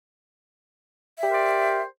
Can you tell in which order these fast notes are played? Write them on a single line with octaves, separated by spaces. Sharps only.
E5 G4 A#4 C5 D5